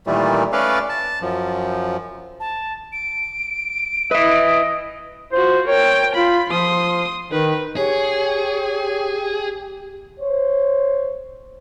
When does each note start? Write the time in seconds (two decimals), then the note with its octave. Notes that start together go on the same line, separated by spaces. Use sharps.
0.07 A#2 D#3 E3 G3 A3
0.52 A3 C#4 A4 B4 D5 F5
0.89 A5
1.22 F#2 F3
2.40 A5
2.92 D7
4.11 B4 D#5 E5
5.33 F4 F#4 C5
5.68 A#4 C#5 G5
6.16 F4 B5
6.50 F3 C6 D#6
7.31 D#3 D#4 B4
7.76 G4 G#4 C#5
10.20 C5 C#5